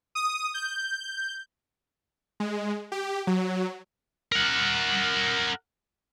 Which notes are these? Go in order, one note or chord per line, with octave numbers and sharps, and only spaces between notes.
D#6
G6
G#3
G4
F#3
A#4 F#5